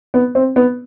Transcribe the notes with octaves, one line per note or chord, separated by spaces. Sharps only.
B3
C4
B3